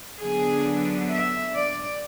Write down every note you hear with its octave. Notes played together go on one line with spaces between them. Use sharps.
D3 F#3 B3 D4 G#4
E5
D5